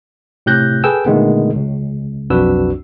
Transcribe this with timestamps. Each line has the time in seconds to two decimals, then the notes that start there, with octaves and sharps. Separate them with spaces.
0.46 A2 C3 G4 F#6 G6 A#6
0.84 G#4 A4 B4 G5 G#5 E6
1.06 A#2 D3 D#3 G#3 A3 B3
1.56 C#2
2.30 B1 F2 D4 F#4 B4 E6